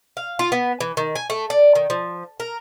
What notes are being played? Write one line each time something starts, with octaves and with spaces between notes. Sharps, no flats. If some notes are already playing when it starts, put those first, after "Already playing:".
F5
F4
B3
E3
D#3
G#5
A3
D5
D#3
F3
A#4